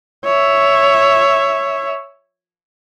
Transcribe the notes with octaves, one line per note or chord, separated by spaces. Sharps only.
C#5 E5